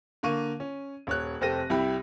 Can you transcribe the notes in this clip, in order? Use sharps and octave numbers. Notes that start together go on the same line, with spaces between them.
D3 A#3 C#6 D#7
C#4
D#1 C#5 F#6
F1 C4 G4 A4 A#6 D#7
C2 G3 E4 G4 B5